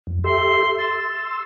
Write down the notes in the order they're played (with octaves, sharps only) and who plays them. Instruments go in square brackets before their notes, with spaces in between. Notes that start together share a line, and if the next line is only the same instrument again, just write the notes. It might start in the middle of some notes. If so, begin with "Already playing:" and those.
[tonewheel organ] F2
[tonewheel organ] G4 A4 E5 [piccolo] C6
[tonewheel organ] C6 E6 [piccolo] A6